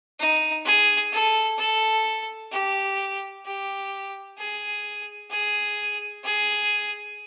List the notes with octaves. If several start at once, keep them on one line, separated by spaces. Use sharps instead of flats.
D#4
G#4
A4
A4
G4
G4
G#4
G#4
G#4